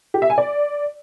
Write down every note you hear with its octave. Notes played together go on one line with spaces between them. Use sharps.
G4
E5
G#5
D5